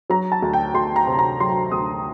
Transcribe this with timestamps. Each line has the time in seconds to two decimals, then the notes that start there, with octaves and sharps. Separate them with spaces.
0.10 F#3 A#5
0.32 A5
0.42 D2
0.53 G5
0.74 D2 C6
0.96 A#5
1.07 C3
1.19 A#5
1.40 F#3 C6
1.72 D2 D#6